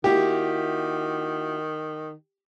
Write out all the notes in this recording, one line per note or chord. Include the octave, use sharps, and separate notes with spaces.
D#3 A#3 E4 F#4 G4